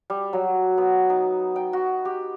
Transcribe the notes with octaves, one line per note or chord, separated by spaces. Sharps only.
G3
F#3
B3
D#4
G5
F#4
G4